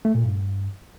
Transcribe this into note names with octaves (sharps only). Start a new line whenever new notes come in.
A3
A#2
G2